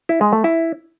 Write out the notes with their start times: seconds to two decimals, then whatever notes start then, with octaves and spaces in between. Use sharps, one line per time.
0.09 E4
0.21 G#3
0.33 A3
0.44 E4